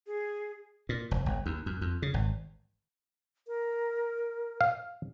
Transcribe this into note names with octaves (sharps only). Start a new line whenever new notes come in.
G#4
A#2
F1
G1
D#2
F#2
F2
C#3
G#1
A#4
F5